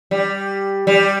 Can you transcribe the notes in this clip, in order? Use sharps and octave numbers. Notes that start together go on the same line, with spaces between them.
G3
G3